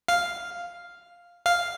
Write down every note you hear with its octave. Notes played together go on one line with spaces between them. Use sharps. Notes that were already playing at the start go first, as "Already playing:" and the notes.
F5
F5